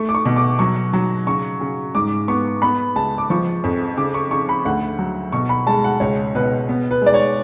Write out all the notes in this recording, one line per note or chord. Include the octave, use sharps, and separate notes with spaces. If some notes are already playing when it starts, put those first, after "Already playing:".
Already playing: A3 C#6
D6
C#6
B2
D6
F#3 C#6
F#3
C#3 C#6
C#3
G#2 D6
B3 C#6
B3 B5
C#2 A5
D6
F3 C#6
F2
C#3 D6
C#6
C#3 C#6
B5
D2 F#5
F#3
B2 C#6
B5
G#3 A5
F#5
C#2 C#5
B2 B4
B3
B4
G#3 D5
C#5